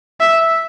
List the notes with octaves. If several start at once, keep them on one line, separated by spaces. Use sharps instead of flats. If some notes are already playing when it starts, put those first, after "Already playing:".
E5